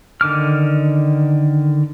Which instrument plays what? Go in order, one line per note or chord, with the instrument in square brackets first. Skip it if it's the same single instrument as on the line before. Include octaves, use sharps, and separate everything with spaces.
[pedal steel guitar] D3 D#3 D6 F6